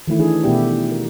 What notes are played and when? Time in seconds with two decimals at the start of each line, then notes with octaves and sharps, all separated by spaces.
0.07 D#3 E3 A3 E4
0.19 E3 D4 G#4
0.43 B2 A3 B3 E4 G4 D5
0.92 A#4